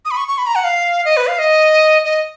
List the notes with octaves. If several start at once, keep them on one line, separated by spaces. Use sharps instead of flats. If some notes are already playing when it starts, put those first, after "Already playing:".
D#6
B5
C#6
C#6
B5
A#5
F#5
F5
D#5
B4
F5
D#5
D#5